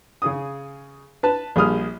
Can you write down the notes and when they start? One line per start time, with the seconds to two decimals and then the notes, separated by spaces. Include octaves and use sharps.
0.22 C#3 G#4 D#6
1.23 B4 A5
1.56 A#1 G3 G#4 D#6 F6